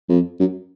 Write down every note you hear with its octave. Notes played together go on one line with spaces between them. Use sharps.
F2
F#2